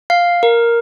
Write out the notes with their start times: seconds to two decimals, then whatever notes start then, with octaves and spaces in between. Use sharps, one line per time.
0.10 F5
0.43 A#4